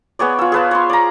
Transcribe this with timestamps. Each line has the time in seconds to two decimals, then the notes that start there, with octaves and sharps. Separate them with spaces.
0.19 B3 G#4 C#5 D5
0.39 F4 E6
0.52 G#4 B4 A5
0.71 C#5 C6
0.90 D5 A#5